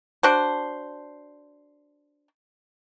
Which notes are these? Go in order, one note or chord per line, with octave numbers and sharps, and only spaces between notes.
D4 F#4 C5